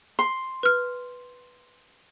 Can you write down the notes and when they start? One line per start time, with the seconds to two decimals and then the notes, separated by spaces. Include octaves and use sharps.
0.19 C6
0.63 B4 F6